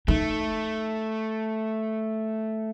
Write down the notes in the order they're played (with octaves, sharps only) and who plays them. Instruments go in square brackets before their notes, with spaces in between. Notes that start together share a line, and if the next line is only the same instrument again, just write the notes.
[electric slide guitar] A3 [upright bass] D#4